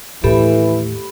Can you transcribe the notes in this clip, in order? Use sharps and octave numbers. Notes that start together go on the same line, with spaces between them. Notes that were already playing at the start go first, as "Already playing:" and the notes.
D#2 A2 E3 G4 A4 B5